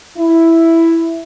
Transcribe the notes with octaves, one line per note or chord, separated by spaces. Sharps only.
E4